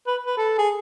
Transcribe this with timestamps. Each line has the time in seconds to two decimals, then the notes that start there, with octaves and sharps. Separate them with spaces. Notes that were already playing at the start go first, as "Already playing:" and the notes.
0.07 B4
0.26 B4
0.37 A4
0.58 G#4